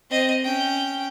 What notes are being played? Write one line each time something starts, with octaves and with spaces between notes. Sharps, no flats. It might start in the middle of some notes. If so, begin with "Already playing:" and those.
C4 D#5
C#4 G5